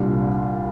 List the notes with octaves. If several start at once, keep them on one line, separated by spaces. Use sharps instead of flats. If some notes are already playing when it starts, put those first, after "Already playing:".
Already playing: C2 A#2 G3 D4 F4